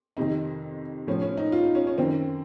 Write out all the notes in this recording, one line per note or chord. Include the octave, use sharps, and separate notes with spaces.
F2 C3 D#3 D#4
A2 F3 C#4
C#4
D#4
F4
D#4
C#4
C#4
F#2 D#3 C4